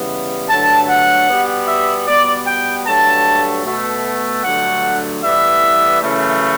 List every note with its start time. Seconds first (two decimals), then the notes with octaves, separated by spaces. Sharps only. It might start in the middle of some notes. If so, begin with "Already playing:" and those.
Already playing: C#3 E3 G3 B3
0.49 G2 D3 F#3 A3 A5
0.89 F#5
1.28 B2 G3 B3
1.67 E5
2.06 B2 G3 B3 D5
2.46 G5
2.86 G2 F#3 A3 A5
3.64 B2 A3
4.43 G2 D3 F#3 A3 F#5
5.22 A2 E3 G3 B3 E5
6.01 F#2 C#3 E3 A3